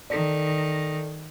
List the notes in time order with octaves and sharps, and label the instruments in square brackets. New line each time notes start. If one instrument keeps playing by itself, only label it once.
[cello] D#3 [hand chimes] A4 D5